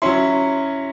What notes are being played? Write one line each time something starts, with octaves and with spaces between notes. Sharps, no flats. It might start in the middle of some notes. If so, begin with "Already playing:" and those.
F#3 C#4 E4 C6